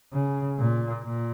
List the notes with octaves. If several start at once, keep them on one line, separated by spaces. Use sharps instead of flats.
C#3
A#2
A#2